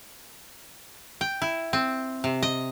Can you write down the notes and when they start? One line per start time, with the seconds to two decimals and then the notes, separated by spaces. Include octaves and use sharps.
1.21 G5
1.42 E4
1.73 C4
2.24 C3
2.42 D#5